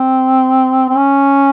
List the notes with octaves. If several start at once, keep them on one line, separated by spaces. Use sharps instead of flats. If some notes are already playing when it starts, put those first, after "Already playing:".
Already playing: C4
C4
C#4